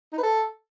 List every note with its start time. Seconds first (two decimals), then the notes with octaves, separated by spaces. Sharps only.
0.12 D#4
0.18 B4
0.23 A4